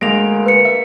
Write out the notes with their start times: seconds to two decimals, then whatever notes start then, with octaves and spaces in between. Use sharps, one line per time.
0.01 D2 G#3 A#3 A#6 D7 F7
0.46 B4 C#7
0.65 E5